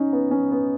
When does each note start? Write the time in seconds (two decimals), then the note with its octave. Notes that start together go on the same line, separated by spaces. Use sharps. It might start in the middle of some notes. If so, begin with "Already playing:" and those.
Already playing: C#4 D#4
0.13 B3
0.31 C#4
0.52 B3